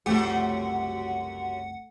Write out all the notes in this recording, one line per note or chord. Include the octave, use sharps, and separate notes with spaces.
F#1 C2 F#2 F3 A3 F#4 G4 F#5